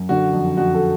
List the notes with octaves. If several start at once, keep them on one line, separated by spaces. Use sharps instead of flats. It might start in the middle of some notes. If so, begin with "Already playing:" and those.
Already playing: F#2
D3 F#4
F2
F2 F#4
A4